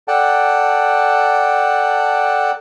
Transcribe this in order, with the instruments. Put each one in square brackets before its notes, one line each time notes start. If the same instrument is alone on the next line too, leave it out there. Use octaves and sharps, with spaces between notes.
[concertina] A4 D5 F#5 G5 A5